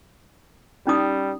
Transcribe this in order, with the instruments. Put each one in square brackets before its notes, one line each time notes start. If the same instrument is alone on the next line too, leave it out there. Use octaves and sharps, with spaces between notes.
[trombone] G3 [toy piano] C#4 D#4 D#6